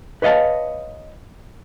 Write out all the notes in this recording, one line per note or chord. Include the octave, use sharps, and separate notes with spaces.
B4 C#5 D#5 F5 A5